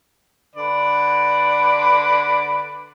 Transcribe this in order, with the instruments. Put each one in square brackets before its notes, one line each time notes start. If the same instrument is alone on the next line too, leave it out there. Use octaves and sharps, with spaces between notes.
[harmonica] D3 B4 D5